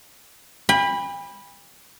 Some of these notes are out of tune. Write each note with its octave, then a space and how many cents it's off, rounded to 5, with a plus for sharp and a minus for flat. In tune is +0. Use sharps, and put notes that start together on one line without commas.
G5 +45 B5 -5